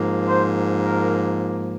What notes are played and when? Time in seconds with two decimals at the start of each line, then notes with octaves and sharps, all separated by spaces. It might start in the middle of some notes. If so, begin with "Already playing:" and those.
Already playing: G#2 F3 A#3
0.28 C5
0.82 A#4